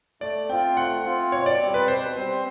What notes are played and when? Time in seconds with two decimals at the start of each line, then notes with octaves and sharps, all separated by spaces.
0.21 A3 D5
0.49 C4 F4 G5
0.77 A3 F#5
1.05 C4 F4
1.32 B2 C#5
1.46 D5
1.60 G3 C4
1.74 B4
1.88 B2 C5
2.16 G3 C4